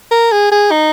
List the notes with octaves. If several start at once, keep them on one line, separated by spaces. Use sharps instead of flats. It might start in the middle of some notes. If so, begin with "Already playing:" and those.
A#4
G#4
G#4
D#4